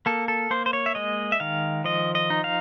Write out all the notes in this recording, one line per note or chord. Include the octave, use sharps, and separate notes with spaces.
A#3 A4
A4
A#3 C5
C5
C#5
E5
G#3 D#5
E5
D#3 F5
F3 D#5
D#5
D#4
F5